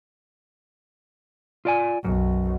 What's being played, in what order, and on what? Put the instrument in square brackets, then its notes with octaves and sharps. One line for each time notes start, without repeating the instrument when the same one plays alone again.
[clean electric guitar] F4 D5 G#5
[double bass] B1 [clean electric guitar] F#2